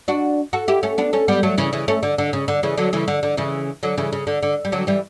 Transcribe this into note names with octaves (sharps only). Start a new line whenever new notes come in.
D4 F#4
F#4 A4
E4 G4
A3 C#4
B3 D4
A3 C#4
G3 B3
F#3 A3
C#3 E3
C#3 E3
A3 C#4
D3
D3
C#3
D3
C#3 E3
D3 F#3
C#3 E3
D3
D3
C#3 E3
D3 F#3
C#3 E3
C#3
D3
D3
G3
D3 F#3
E3 G3